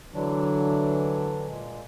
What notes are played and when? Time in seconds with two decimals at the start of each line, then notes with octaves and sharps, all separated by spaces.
0.14 D3 E3 F#3 D4
1.46 A#2 G#3